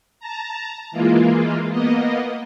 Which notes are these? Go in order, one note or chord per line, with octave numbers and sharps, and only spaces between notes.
A5 A#5
E3 G#3 A#3 F4
A#3 B3 D#5